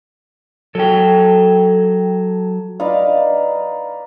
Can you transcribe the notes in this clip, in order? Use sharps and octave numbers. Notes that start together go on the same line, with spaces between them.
F#3 A4 G5
D#4 B4 D5 F5